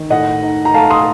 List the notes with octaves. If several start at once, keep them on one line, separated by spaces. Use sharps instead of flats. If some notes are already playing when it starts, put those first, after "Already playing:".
Already playing: D#3
A2 D#5 F#5
D#4
A#5
A3 F5 A5
C6 D#6